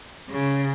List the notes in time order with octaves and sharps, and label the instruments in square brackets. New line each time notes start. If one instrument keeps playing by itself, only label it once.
[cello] C#3